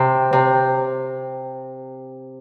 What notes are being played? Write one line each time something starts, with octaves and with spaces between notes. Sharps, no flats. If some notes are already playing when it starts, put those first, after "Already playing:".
Already playing: C3
C3